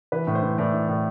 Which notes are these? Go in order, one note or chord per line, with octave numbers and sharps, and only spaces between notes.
E3 B4
A2
C5
E3
A2 D5
E3
A2